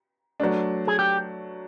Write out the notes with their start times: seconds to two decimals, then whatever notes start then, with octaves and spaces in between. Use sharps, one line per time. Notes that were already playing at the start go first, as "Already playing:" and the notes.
0.40 F#3 A3 D4
0.87 G#4
0.99 G4